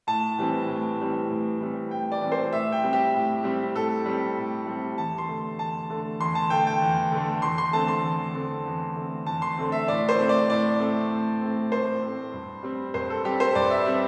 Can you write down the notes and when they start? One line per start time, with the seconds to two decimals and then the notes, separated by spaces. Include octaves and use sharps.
0.07 A2 A5
0.38 E3 G3 C4
0.68 A2
0.99 E3 G3 C4
1.29 A2
1.60 E3 G3 C4
1.91 A2 G5
2.12 D5
2.21 E3 G3 C4
2.32 C5
2.53 A2 E5
2.72 G5
2.83 G3 C4
2.93 G4
3.14 A2
3.44 G3 C4
3.75 A2 A4
4.06 G3 C4
4.37 A2
4.67 G3 C4
4.98 E2 A5
5.18 C6
5.28 D3 A3
5.59 E2 A5
5.90 D3 A3
6.20 E2 C6
6.35 A5
6.50 D3 A3 G5
6.67 G5
6.82 E2
7.12 D3 A3
7.42 E2 C6
7.58 C6
7.73 D3 A3 C4 A5
7.88 C6
8.05 E2
8.34 D3 A3 C4
8.66 E2
8.96 D3 A3 C4
9.26 E2 A5
9.42 C6
9.58 D3 A3 C4
9.72 E5
9.88 A2 D5
10.09 C5
10.19 A3 C4
10.29 D5
10.49 A2 D5
10.80 A3 C4
11.11 A2
11.41 A3 C4
11.71 A2 C5
12.02 A3 C4
12.34 G2
12.63 G3 C4
12.94 G2 C5
13.10 A4
13.25 G3 C4 G4
13.40 C5
13.55 G2 D5
13.70 E5
13.86 G3 C4